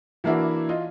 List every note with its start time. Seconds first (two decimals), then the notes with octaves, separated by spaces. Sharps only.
0.24 E3 A#3 D4 E4 F#4
0.69 F4 D#5